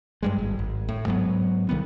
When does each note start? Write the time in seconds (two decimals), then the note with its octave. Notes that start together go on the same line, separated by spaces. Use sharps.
0.23 G2 G3 G#3
0.39 G#1
0.59 G#1
0.89 A2
1.07 G#2 F#3 G3 B3
1.69 B1 D#3 G3 B3